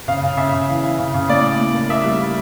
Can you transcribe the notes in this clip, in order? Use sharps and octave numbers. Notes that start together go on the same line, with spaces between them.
C#3 F5
C#3
C#3 E5
C#3
E3
E3
C#3
C#3
A2 D5
A2
A2
A#3
A#3 E5
G3
A#3